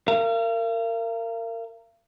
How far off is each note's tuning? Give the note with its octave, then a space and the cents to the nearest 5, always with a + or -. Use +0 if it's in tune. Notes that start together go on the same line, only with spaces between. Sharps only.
A#4 -25 F5 -40